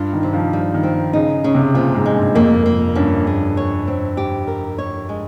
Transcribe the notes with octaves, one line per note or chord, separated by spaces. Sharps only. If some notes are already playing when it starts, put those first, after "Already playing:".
Already playing: G2 F4
D#3
C3
F3
G3
D#3
C4
D#3
C#3 D#4
C#3
C3
A#2 F3
G#2
G#3
G2
F2 A#3
A#3
G2 C#4
G#4
C#5
C4
G4
A#4
C#5
G#3